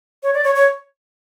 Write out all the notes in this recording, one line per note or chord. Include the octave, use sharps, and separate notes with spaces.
C#5
D5
C#5
C#5